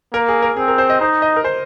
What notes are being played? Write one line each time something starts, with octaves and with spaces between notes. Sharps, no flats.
A#3 A#4
G#4
A#4
C4 G#4
A#4
C5
D#5
D#4 C5
D#5
A#4
C5